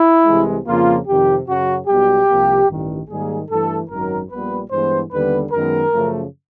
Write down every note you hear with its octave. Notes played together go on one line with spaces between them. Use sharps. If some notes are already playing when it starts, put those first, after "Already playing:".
Already playing: E4
C2 C3 E3 G#3
F2 C#3 F3 A#3 F4
F2 C3 D#3 G4
F#2 C#3 F#3 F#4
B1 B2 G3 G4
C2 C3 F3 A#3
A1 G2 D#3
G#2 D#3 G3 A#3 G#4
G2 E3 A3 A4
G#1 F#2 D#3 F#3 A#4
A#1 A#2 G3 B3 B4
G2 E3 G#3 B3 C5
D#2 D3 G3 B3 B4
F#2 D#3 G#3 B3 A#4
F#2 C#3 F3 A3